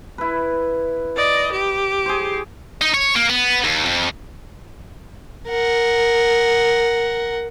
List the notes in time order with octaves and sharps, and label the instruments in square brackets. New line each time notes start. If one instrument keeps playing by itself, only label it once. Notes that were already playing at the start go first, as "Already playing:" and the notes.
[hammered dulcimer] E4 B4
[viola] D5 D#5
G4
[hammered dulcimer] G#4 C5
[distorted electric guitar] D#4
C#5
A#3
B3
D#2
F2
[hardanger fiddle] A#4 F#5